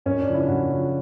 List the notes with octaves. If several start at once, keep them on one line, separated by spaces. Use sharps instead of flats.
F#2 C#4
D4
C#3 F3
E4
F#2 F#4
C#3 F3